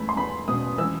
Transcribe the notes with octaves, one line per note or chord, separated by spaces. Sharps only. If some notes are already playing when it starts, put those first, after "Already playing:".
Already playing: E2 A3 B5
C6
E2 B5
B2 D#6
E3 E6